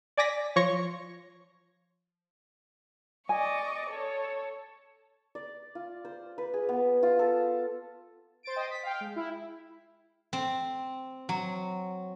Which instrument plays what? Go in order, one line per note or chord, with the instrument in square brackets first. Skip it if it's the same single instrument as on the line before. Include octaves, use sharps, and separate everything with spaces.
[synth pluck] D5 G#5 D6 A#6 B6
F3 C#5 C6 C#6 A#6
[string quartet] D5 D#5 C#6 [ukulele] G#5
[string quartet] A4 C#5
[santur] D5
F4
C5
B4
G#4
B3
F4
A4
[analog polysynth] C5 A6 D7
C5 D#5 G5 D#6
B6
F5 G5
G#3
E4
[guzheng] C4
F#3